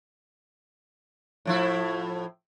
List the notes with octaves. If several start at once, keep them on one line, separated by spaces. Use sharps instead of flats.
A2 F3 E4